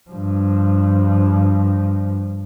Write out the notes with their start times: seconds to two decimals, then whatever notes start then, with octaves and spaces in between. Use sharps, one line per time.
0.11 G2 F3